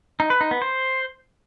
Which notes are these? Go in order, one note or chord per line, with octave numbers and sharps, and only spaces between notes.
D#4
B4
D#4
B3
C5